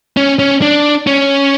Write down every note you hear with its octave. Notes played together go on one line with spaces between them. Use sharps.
C#4
C#4
D4
C#4